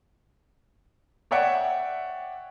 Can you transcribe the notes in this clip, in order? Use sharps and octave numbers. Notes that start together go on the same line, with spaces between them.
C#5 D5 E5 F#5 G5